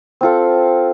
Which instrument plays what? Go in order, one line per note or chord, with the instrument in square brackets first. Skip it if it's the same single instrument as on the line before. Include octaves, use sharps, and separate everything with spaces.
[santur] C4 F4 A4